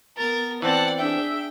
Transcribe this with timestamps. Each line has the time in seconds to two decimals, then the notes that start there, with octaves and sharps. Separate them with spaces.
0.18 B3 A#4 A6
0.62 E3 C4 D5 F#5 A5
0.98 D4 G#4 E5 G5